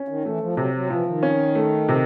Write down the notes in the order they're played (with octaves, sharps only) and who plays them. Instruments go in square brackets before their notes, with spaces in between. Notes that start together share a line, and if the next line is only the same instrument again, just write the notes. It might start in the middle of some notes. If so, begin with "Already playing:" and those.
Already playing: [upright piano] C#4
[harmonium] D#3
[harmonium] E3 [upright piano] A3
[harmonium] F3
[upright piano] C3 [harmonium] F#3
[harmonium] F#3
[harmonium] E3 [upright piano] F3
[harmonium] D#3
[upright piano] C#4
A3
C3